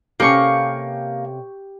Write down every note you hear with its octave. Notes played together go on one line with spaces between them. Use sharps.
C3 A#3 C#4 G4 A4 C#6